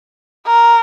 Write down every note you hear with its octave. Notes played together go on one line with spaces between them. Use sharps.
A#4